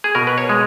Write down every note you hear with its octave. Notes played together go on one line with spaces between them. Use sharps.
G#4
B2 A#4
B4
C#5
G#3